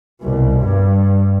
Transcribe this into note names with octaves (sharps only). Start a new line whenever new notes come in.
C2 B2
G2 G3